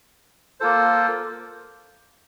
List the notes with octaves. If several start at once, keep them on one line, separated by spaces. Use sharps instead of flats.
A#3 F4 A4 C5